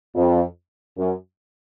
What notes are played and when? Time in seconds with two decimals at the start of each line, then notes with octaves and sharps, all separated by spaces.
0.15 F2
0.98 F#2